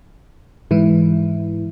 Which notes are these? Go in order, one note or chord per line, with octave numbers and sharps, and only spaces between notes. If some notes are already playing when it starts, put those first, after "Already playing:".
G#2 E3 E4